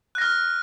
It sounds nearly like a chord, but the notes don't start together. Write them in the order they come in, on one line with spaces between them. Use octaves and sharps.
F#6 A#6 F6